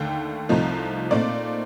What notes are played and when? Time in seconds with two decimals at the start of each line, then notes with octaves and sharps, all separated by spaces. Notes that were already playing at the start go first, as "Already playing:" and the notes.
Already playing: D#2 D3 A3 G5
0.49 C2 C3 F3 A3 D#4
1.11 A#2 A3 C4 D#4 D5